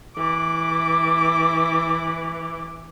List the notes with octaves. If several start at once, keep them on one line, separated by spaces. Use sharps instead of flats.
E3 D6